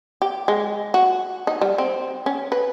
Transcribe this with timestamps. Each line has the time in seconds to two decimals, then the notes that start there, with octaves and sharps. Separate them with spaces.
0.22 G4
0.48 G#3
0.94 F#4
1.47 D#4
1.61 G3
1.78 C4
2.26 C#4
2.52 B4